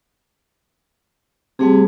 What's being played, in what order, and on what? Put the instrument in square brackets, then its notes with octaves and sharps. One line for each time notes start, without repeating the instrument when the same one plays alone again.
[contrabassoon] C3 [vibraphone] G3 A3 G#4